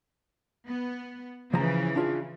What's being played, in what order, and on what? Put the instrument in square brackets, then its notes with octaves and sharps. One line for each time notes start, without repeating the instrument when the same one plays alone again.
[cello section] B3
[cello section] C#3 E3 [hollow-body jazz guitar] F3 A#5
[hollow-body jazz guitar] D4 F4 G#4